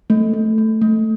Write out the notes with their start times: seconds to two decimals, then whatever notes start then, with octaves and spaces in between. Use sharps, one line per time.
0.10 A3
0.34 A3
0.58 A3
0.82 A3